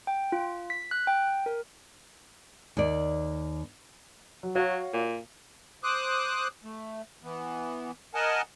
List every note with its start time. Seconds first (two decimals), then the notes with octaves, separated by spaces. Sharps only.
0.07 G5
0.32 F4
0.70 B6
0.91 F#6
1.07 G5
1.46 A#4
2.77 D#2 D5
4.43 F#3
4.55 F#3 F#4 C#5 F5
4.93 A#2
5.84 C5 D6 D#6 F#6
6.64 A3
7.23 E3 B3
8.14 A#4 D#5 F#5 G#5 A5